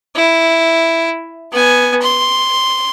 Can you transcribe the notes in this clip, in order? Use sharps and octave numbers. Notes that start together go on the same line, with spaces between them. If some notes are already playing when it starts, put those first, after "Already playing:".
E4
B3 G#5
C6